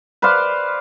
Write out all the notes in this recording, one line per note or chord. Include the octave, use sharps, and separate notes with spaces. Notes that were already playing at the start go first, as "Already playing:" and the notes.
B4 C5 D5 F5